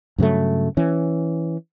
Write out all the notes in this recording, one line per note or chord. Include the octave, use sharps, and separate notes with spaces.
G2 C#3 F#3 A3
E3 C#4